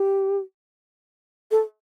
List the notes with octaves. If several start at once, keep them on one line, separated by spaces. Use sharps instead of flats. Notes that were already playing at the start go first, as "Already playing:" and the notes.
Already playing: G4
A4